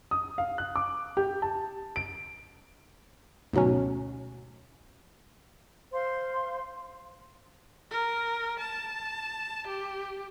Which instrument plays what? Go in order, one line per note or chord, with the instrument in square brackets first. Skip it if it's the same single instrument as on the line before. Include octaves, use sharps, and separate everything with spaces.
[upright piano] D#6
F5
F#6
D6
G4
A5
D7
[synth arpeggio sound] D2 G#2 B2 F#3 C#4
[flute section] C5 F5 C6
[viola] A#4
A5
G4